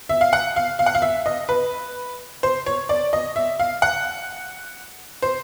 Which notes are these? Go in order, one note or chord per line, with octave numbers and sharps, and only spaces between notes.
E5
F5
F#5
F5
F5
F#5
F5
E5
D#5
B4
C5
C#5
D5
D#5
E5
F5
F#5
C5